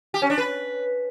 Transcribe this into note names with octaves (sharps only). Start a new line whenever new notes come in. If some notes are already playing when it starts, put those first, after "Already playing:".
G4
C#4
D4
B4